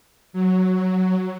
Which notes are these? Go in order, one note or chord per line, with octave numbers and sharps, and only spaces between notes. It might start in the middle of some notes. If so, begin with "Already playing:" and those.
F#3